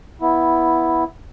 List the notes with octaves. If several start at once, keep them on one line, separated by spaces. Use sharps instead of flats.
B3 E4